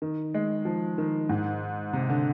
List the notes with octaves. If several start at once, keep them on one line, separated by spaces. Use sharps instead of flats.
D#3
G#3
F3
D#3
G#2
C3
D3